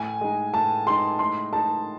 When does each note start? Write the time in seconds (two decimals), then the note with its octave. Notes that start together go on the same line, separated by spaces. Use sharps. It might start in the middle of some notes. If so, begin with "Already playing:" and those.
Already playing: A2 G#5
0.21 G#3 D#4
0.54 A2 A5
0.86 G#3 D#4 C6
1.19 A2 C6
1.52 G#3 D#4 A5